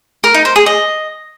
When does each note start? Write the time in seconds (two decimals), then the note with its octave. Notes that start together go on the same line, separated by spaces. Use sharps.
0.24 A#4
0.34 D#4
0.45 C5
0.56 G#4
0.66 D#5